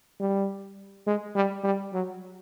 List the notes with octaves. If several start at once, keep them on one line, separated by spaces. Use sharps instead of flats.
G3
G#3
G3
G3
F#3